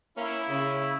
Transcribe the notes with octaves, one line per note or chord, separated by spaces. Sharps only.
A#3 C#4 E4
C#3